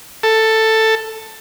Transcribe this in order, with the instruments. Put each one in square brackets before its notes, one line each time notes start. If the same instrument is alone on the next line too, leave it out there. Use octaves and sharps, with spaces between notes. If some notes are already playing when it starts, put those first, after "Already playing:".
[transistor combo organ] A4